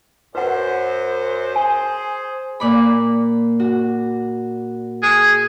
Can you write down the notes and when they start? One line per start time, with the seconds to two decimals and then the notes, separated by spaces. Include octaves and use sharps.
0.35 F#2 B4 C5 F#5
1.56 G#4 C5 G#5
2.60 A#2 D5 B5
3.60 F#4
5.03 G#4